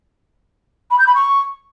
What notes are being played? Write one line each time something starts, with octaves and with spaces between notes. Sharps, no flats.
B5
G6
B5
C#6